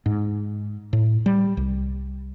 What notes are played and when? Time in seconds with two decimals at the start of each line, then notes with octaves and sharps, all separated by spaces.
0.06 G#2
0.93 A2
1.26 G3
1.57 C2